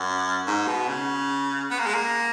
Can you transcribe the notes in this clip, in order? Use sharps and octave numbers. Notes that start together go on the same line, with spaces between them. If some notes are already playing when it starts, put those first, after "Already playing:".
Already playing: F#2
G#2
B2
C#3
B3
A#3
G#3
A#3